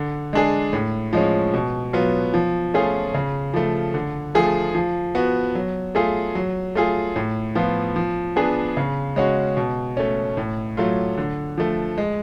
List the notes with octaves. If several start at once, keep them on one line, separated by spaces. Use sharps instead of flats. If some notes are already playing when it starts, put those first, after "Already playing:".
Already playing: D3
G#3 D4 G#4
A2
F3 G#3 C#4
B2
F#3 B3 F4
F3
A3 C#4 F4 G#4
C#3
F3 A3
D3
F3 A3 F4 G#4
F3
B3 F#4
F#3
A3 F4 G#4
F#3
A3 F4 G#4
A2
F3 B3 F4
F3
B3 D4 G#4
C#3
G#3 C#4 F#4
B2
A3 C#4
A2
F#3 A3 F4
D3
F3 A3
G#3